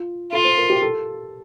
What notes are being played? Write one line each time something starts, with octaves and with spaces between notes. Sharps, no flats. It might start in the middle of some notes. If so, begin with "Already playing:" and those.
Already playing: F4
F4 A4
C5
A#4
G4
A4